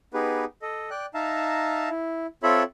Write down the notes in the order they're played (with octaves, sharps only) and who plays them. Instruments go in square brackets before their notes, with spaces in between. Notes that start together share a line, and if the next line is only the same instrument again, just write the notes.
[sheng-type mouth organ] B3 D#4 G4 G#4 B4
A4 D#5
D5 G5 F#6
D#4 E5 F5 A5 A#5
E4
C4 F4 A4 C#5 E5 B5